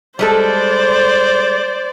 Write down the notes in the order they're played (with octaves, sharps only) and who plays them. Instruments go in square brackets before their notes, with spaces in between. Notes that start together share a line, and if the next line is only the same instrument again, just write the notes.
[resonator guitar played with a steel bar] G3 G#3 A4 [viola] C5 D5